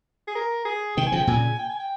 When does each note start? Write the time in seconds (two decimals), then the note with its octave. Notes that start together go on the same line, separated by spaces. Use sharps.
0.28 G#4
0.35 A#4
0.65 G#4
0.97 C3 D#3 G5
1.07 G#5
1.12 C#3 F3
1.16 G5
1.27 A#2 C#3 G#5
1.59 G5
1.69 G#5
1.80 G5